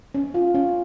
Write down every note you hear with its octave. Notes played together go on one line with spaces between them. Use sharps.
C#4
F4
C#4